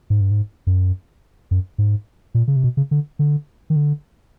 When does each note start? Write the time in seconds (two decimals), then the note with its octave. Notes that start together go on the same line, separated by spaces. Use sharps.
0.10 G#2
0.21 G2
0.31 G#2
0.67 F#2
1.51 F#2
1.78 G#2
2.35 A#2
2.48 C#3
2.56 C3
2.64 B2
2.77 C#3
2.91 D3
3.19 D3
3.70 D#3
3.76 D3